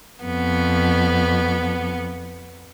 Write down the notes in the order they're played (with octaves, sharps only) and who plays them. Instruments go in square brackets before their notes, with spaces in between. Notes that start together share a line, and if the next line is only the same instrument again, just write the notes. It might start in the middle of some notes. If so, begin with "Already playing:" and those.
[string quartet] F2 B3